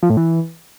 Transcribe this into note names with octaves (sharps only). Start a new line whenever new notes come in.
F3
A2
E3